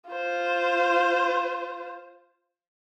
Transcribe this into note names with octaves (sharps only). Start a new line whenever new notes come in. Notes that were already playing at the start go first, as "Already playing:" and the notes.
F4 C5